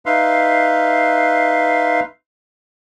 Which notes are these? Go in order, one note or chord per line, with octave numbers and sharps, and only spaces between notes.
D#4 B4 E5 F5 C6